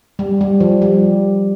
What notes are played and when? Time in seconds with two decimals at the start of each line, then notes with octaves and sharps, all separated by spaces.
0.19 G3
0.41 G3
0.61 F3
0.82 G3